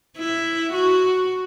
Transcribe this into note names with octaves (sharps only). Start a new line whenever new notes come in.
E4
F#4